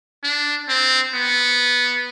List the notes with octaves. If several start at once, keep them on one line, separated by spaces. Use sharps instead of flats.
D4
C4
B3